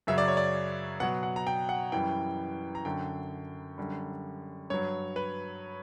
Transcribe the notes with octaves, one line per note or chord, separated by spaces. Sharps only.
F#2 C#3 F#3 E5
D5
C#5
D5
B2 F#3 F#5
F#5
A#5
G5
F#5
F#2 E3 G3 G5
A#5
F#2 D3 F#3 G5
F#2 D3 G3
G2 F#3 C#5
B4